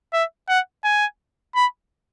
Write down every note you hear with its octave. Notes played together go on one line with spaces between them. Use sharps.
E5
F#5
G#5
B5